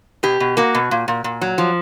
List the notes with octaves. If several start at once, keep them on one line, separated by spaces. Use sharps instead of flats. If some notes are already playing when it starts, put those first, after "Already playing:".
B2 G4
B2
A#3 F#4
B2
A#2
A#2
A#2
F#3
F3